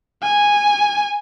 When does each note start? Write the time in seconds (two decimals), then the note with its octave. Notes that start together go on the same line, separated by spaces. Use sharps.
0.23 G#5